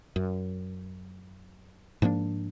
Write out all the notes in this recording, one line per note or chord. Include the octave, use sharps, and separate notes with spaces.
F#2
G#2 F3 A#3 D4